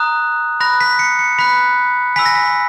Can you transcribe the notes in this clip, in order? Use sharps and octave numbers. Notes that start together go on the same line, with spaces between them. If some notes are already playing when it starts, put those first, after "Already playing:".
Already playing: A#5 D#6 F#6
B5 F#6 A#6
B6
C#7
C#7
B5 F#6 B6
G#5 B5 E6 B6
A#6
B6